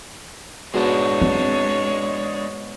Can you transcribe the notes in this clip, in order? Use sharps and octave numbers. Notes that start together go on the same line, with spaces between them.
G#2 B2 G#3 D4 C#5
C4